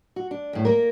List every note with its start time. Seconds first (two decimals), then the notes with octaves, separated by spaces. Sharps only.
0.16 F#4
0.31 D4
0.53 E2 A2
0.65 A#3 A#4